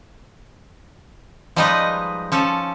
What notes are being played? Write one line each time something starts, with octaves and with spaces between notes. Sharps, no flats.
F3 G3 G#3 D#4 B4 D#5
F3 C#4 A4